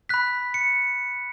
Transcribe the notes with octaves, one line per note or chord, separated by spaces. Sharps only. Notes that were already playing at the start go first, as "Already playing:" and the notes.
B5 F#6 B6
C#7